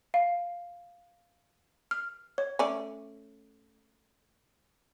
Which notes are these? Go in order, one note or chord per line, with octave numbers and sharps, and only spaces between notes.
F5
F6
C#5
A3 C#4 D5